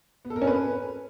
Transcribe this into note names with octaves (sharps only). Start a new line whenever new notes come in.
B3
A4
A#4
C#4
B4